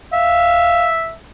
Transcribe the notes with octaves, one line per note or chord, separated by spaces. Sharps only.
E5 F5